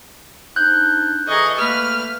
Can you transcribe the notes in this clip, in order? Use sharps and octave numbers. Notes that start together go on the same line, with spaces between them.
C3 D4 D#4 F#6 G6
E3 G#4 A4 D#5 A#5 C#6
A3 A#3 B4 F6